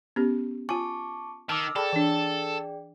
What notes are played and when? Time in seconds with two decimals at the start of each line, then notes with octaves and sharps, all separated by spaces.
0.16 B3 C#4 G4
0.69 F4 G#5 A5 C#6 D6
1.49 D#3 A5 D6 E6 F6
1.76 G#4 A4 D5 G5 A5 B5
1.93 E3 D4